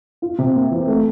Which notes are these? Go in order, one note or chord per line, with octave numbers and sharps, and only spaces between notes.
F4
C3
A#3
E3
A3